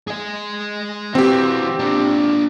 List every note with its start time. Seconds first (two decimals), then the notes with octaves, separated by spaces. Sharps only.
0.07 G#4 D#5
1.15 E3 C4 F#4 G4
1.79 D4 F4